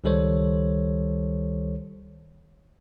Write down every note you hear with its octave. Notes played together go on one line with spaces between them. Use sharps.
C#2 D#3 G3 A4 C5 C#5